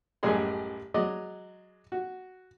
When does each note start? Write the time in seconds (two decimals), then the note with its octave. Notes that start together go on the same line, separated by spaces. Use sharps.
0.23 A1 F#2 G3 G#3 G#4 C6
0.94 F#3 G#3 D5 D#5
1.92 F#4